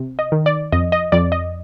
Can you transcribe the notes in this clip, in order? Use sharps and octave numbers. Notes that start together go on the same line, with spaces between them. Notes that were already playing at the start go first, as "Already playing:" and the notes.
Already playing: C3
D#5
D#3
D5
F2 D#5
D#5
F2 D5
D#5